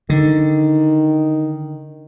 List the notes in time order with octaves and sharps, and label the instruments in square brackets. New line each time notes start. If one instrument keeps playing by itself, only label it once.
[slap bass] D3 [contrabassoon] D#3